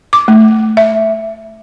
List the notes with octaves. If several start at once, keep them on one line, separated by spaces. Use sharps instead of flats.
D6
A3
E5